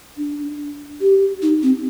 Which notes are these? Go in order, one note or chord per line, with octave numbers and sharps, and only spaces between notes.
D4
G4
D#4
C4